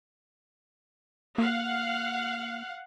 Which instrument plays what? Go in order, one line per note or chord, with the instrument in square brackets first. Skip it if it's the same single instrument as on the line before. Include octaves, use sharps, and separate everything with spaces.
[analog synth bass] A#3 [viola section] F5 F#5